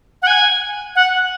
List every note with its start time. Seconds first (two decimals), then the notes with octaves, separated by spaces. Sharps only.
0.22 F#5
0.27 G#5
0.96 F#5